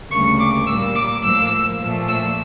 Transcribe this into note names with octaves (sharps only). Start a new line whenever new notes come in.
D2 C#3 G3 A#3 C#6
D6
A#2 G3 A#3 E6
D6
A2 F3 A#3 E6
A#2 F3 A3
E6